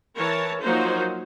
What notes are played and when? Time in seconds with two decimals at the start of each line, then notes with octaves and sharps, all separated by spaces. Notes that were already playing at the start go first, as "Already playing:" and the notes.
0.17 E3 A#4 C#5 A5
0.60 F3 F#3 A#3 D#4 C5